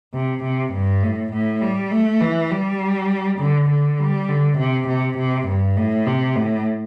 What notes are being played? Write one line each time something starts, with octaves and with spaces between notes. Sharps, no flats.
C3
C3
G2
A2
A2
G3
A3
E3
G3
D3
D3
G3
D3
C3
C3
C3
G2
A2
C3
A2